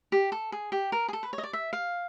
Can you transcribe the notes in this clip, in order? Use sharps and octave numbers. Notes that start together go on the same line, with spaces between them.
G4
A4
G#4
G4
A#4
G#4
A4
B4
C#5
D#5
D5
E5
F5